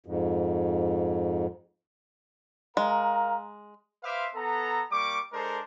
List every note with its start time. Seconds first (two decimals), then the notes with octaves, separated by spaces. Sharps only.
0.06 F2 G#2
2.77 G#3 A#4 F5 A#5
4.04 B4 C5 E5 F5 C6 D6
4.35 B3 A4 A#5
4.91 G3 A#3 C#6 D6
5.33 G#3 D4 A4 A#4 C5